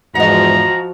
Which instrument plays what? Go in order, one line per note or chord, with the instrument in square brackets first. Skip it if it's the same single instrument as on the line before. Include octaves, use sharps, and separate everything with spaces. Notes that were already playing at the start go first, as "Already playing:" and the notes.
[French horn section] E2 G#2 [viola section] F3 F#4 [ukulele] D#5 F#5 [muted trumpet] A#5